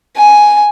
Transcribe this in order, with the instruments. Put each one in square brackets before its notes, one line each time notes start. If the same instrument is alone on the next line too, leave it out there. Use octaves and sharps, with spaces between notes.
[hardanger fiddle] G#5